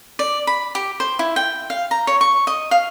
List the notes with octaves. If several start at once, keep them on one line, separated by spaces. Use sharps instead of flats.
D5
B5
G4
C5
E4
G5
F5
A#5
C#5
C#6
D#5
F5